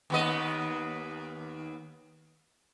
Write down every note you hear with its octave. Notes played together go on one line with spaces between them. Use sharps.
D#2 B3 D#5